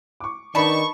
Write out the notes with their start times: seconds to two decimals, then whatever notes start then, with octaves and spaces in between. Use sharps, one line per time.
0.20 C#6 D6
0.55 D#3 D4 D#4 B4 A5 B5 C#6